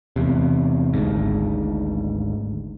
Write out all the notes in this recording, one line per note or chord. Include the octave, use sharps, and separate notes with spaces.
E2 C3
G#1 D2 G#2